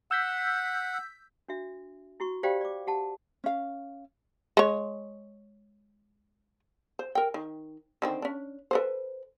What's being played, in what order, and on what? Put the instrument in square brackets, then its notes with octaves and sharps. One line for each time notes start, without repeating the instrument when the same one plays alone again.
[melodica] F#5 [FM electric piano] E6 G6 B6
[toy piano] D4 F#4 E5
E4 F#4 C#6
G4 C5 D5 F5 G5 B5
D5 D6
G4 F#5 A5
[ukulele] C#4 F5
[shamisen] G#3 C#5
C5
A#4 G5
D#3
D3 D#3 C4
C#4 D4
A4 B4 C5